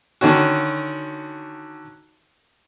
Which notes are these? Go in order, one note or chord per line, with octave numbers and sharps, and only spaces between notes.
D3 D#3 C#4 F#4